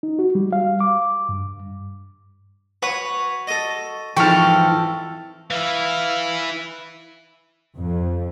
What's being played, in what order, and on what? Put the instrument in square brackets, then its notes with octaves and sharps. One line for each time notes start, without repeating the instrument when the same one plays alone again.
[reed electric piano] D#4
F#4
G3
F5
D6
G2
[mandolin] F#4 C#5 [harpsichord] B4
[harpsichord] A4 D#5
[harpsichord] F2 G#2 [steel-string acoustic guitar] E3 F3 [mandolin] A4 C#6 [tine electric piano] G5 F6
[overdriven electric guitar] E3 E4 [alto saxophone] F5
[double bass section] F2